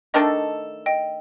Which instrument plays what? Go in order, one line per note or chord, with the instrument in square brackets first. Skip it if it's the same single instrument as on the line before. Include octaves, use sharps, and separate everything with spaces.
[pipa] D#3 A3 D4 A4 [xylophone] D#5
[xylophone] D#5 G5